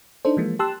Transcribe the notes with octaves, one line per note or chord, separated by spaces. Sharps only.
D4 D#4 A4 C5
E3 F3 G#3 A#3
G4 A5 C6 E6 F#6